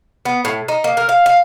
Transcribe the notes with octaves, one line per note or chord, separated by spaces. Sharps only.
B3
A2
D#4
A#3
A#4
F5
F5